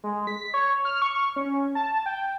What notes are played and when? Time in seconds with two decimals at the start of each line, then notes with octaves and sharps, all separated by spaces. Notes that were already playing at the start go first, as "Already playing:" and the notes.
0.04 G#3
0.27 B6
0.54 C#5
0.85 F6
1.02 C#6
1.36 C#4
1.75 A5
2.06 G5